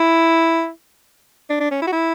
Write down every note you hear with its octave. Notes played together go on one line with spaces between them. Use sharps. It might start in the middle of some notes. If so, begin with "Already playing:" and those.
Already playing: E4
D4
D4
C#4
E4
F#4
E4